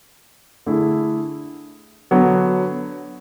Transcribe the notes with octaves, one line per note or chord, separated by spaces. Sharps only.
D3 A3 E4 G#4
D3 F#3 B3